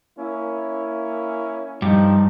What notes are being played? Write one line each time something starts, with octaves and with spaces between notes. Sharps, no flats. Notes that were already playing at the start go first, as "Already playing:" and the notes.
A#3 C#4 E4
G2 F3 D#4